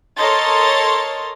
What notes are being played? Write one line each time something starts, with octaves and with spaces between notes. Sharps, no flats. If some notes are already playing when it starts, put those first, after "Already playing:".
A4 A#4 C#5 D#5 C6 A6